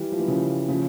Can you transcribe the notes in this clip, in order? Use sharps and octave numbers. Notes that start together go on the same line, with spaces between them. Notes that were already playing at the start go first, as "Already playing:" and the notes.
Already playing: E3 G3
F3
E3
C#3 F3
C#3 F3